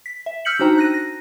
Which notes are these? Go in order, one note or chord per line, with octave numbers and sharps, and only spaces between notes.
B6
E5
E6 F6 G6 B6 C#7 F#7
D4 D#4 F#4 C5 G5 A#5
F#6 A#6 D#7
A#6